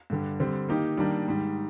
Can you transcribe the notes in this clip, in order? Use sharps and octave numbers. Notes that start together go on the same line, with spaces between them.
G2 D3 G3
D3 G3 C4
D#3 A#3 D#4 G4
D#3 G3 A#3 D4
G#2 D#3 G3